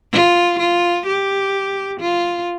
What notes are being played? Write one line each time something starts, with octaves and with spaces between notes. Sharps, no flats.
F4
F4
G4
F4